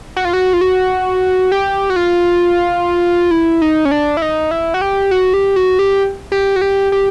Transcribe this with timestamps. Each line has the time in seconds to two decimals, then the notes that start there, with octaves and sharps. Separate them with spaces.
0.16 F#4
0.25 F4
0.33 F#4
0.53 F4
0.61 F#4
1.52 G4
1.90 F#4
1.96 F4
3.31 E4
3.62 D#4
3.85 C#4
3.91 D4
4.17 E4
4.22 D#4
4.51 E4
4.74 F#4
4.81 G4
5.11 F#4
5.34 G4
5.56 F#4
5.79 G4
6.32 G4
6.56 F#4
6.61 G4
6.92 G4